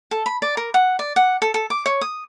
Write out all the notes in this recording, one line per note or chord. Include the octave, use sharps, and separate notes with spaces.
A4
B5
D5
A#4
F#5
D5
F#5
A4
A4
D6
C#5
D#6